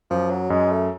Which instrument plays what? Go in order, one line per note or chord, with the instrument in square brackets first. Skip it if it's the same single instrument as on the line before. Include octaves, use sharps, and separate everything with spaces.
[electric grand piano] F#2 [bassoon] F3
[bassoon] F#3
[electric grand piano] F#2 [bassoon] G#3
[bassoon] A3